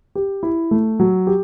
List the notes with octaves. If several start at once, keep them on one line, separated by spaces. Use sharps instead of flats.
G4
E4
A3
F#3
G4